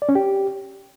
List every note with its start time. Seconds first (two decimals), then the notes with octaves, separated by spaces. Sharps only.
0.02 D5
0.09 C#4
0.15 G4